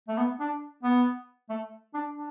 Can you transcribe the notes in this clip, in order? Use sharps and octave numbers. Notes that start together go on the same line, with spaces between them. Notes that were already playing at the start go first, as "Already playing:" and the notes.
A3
B3
D4
B3
A3
D4
D4